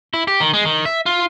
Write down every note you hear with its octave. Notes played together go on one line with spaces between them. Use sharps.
E4
G4
D#3
G#3
D#3
E5
F4